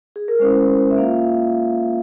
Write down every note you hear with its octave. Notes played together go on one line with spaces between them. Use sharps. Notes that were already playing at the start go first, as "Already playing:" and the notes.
G#4
A#4
G#3 C#4 E4 C5
E5
A#3 F4 F5